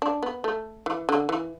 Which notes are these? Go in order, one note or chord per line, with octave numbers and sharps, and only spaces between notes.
D4
B3
A3
E3
D3
E3